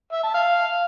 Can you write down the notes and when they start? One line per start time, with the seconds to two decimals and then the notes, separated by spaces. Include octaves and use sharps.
0.12 E5
0.23 A5
0.34 F5